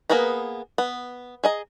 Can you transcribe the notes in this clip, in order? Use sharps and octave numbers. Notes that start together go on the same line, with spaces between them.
A#3 B3 G#4 B4 A#5
B3
G#4 D#5 A#5